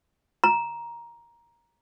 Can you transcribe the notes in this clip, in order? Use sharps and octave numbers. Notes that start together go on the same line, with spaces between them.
A#5